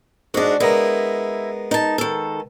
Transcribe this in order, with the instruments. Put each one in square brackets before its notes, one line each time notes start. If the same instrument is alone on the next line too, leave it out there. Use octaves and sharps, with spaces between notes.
[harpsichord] G#2 G#3 [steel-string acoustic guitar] D4 F#4
[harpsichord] G#3 B3 A#4 [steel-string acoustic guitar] E4
[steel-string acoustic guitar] D#4 A5
D#3 A4